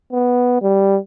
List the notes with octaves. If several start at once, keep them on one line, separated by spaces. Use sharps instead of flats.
B3
G3